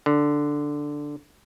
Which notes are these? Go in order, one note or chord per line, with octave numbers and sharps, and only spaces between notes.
D3